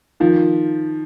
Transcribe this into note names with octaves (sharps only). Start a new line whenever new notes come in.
D#3 F3